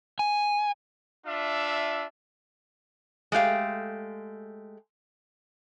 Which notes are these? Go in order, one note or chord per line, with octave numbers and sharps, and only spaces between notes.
G#5
D4 F4 E5
G#3 A3 G4 F5